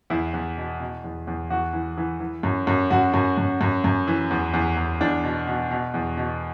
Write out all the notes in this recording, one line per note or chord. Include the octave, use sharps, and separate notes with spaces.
E2 E4
E2
B2
B2
E2
E2
E2 F#4
E3
E3
E3
F#2
F#2
F#2 F#4
F#2
F#2
F#2
F#2
E3
E2
E2
E2
E2 D4
B2
B2
B2
E2
B2